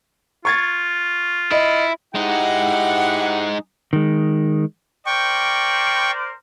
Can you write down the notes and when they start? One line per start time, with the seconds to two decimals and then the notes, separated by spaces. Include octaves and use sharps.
0.45 F4 C#6 G#6 A6
1.51 E4 D#5
2.15 G#3 D#4 E4 G4 F#5
3.93 D#3 G#3
5.06 A#4 C5 D5 G5 C#6